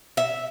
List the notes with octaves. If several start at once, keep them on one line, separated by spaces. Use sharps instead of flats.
E5